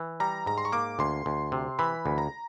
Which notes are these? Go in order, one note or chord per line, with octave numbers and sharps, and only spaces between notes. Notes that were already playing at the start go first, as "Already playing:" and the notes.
Already playing: E3
G3 A#5
G#2 A#5
C6
C#6
A#3 D6
D2 C6
D2
C3
E3 B5
D2
A#5